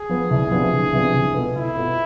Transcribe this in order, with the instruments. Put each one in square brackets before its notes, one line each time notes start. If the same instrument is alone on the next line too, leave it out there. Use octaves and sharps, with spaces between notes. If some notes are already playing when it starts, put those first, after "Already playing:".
Already playing: [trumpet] G#4
[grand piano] F3 B3
C2
C3 F3 B3 D4
C2
C3 F3 B3 D4
C2
B2 B3 F4 A4
[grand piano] C2 [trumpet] E4
[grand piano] B2 B3 F4 A4